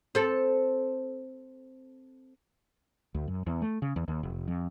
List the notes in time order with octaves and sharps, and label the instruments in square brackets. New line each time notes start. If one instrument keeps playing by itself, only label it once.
[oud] C4 A4
[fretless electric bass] D2
F#2
E2
A3
C#3
E2
D#2
F1
F2